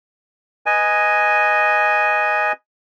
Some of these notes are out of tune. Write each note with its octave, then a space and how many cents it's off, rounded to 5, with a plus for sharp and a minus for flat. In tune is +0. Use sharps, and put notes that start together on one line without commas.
B4 +0 D#5 +0 G#5 +0